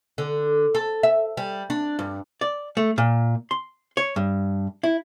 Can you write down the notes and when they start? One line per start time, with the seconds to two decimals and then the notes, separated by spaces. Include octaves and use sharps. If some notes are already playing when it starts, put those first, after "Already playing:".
0.18 D3
0.75 A4
1.03 E5
1.37 G3
1.70 D4
1.99 G2
2.41 D5
2.77 A3
2.98 A#2
3.51 C6
3.97 C#5
4.16 G2
4.83 E4